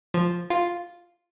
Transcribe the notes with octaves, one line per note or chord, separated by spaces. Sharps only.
F3
F4